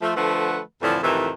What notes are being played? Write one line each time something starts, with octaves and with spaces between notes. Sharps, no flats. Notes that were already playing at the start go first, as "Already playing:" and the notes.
F3 A3
D3 F3 A3 B4 F#5
F2 A2 D3 E3 F3
F2 A2 C3 D#3 E3